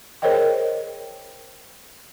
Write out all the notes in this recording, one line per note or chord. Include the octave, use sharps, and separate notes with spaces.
G#4 A#4 C5 C#5 D#5 G5